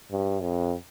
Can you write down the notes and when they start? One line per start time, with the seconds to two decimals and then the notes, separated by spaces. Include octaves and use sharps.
0.11 G2
0.42 F2